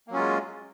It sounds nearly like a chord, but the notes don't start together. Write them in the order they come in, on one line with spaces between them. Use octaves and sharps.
A#3 F#3 C#4 F4 G#3